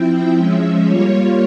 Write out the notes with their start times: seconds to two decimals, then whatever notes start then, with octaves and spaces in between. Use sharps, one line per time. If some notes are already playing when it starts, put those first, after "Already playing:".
Already playing: F3 C4 E4 G5
0.35 F3 G#3 C#4 E5
0.85 G3 A#3 F4 C#5